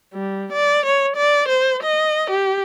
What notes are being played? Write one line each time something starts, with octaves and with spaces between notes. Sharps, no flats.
G3
D5
C#5
D5
C5
D#5
G4